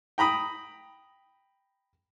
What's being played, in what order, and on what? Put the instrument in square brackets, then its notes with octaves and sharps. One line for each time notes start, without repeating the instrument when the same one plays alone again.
[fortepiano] G5 A#5 B5 D#6